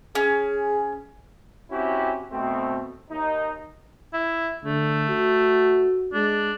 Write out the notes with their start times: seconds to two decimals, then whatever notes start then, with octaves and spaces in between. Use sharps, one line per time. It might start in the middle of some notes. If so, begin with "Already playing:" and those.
0.15 C#4 G#4
1.71 C4 C#4 E4 F#4 G4
2.31 B2 A3 C4
3.11 D#2 D#4
4.13 E4
4.64 D3 A3
5.09 F#4
6.13 G#3 D4